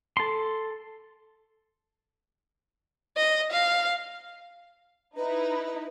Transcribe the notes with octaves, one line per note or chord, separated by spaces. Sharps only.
A4 C6
D#5
F5
D#4 E4 B4